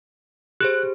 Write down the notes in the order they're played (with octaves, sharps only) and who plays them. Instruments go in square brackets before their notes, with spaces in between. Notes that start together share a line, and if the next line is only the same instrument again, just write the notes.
[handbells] G4 G#4 C5 [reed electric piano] F#6